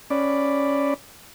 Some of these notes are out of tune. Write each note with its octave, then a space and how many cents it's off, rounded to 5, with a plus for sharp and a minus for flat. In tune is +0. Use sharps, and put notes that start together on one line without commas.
C#4 +0 D5 +0 B5 +0